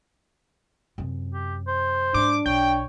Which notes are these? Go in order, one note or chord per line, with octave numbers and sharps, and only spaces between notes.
F#2 C3
G4
C5
G#2 D4 D6
B1 C#5 G5